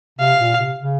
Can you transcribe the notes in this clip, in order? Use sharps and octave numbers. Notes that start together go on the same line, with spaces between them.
C3 F5
A#2
C3
C#3